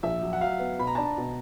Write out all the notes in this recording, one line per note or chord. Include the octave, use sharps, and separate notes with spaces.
A#1 E5
F#3
F#5
F#3 F5
B3
B2 B5
A#5
D4 A5
A#5
B2